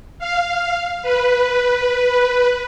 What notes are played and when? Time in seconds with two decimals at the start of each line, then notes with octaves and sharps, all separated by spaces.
0.19 F5
1.02 B4